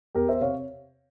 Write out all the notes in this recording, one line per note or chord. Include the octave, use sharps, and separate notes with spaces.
E2 G4 A#4
C5 E5
C3 C#5 F5